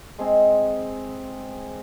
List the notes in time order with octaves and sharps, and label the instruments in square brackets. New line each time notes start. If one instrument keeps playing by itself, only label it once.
[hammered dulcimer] G#3 C4 G#4